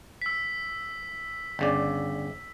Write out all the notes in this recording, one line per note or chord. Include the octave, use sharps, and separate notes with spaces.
E6 B6
G1 C#3 D5